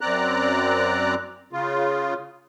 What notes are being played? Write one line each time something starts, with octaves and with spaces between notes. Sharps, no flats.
F#2 C4 D5 A#5 F#6
C#3 F4